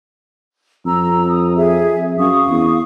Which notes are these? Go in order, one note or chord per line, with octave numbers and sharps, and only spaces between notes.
F2 A#5 E6
D#6
G#4 E5
F#2 F5 C#6 D#6
E2